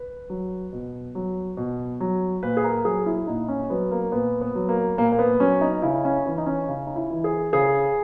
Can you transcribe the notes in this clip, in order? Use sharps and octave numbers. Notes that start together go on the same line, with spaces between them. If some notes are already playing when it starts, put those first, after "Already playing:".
Already playing: B4
F#3
B2
F#3
B2
F#3
A#2 B4
G#4
A#4
F#3 G#4
E4
A#2 D#4
C#4
F#3 B3
A#3
A#2 B3
B3
F#3
A#3
A#2 A#3
A#3
B3
F#3 C#4
D#4
C#3 E4
C#4
E3
D#4
C#4
C#3
D#4
E4
E3
G#4
C#3 G#4